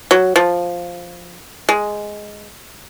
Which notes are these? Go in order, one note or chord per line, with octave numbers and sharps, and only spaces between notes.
F#3
F3
G#3